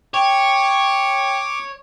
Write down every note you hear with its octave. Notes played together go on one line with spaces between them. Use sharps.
C#5 G5 D6